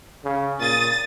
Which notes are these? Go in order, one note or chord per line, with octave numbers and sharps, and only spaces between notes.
C#3
A#2 D#6 A6